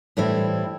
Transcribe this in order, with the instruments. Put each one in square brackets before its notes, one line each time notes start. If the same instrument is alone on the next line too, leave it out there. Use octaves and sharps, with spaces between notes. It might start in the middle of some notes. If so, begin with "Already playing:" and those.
[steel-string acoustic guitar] A2 E3 G3 C4 E4